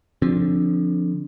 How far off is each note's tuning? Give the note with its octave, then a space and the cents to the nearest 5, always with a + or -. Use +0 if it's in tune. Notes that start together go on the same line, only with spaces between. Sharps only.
D3 +0 F3 +5 C4 +20